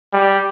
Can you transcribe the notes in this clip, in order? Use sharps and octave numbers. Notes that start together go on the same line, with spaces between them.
G3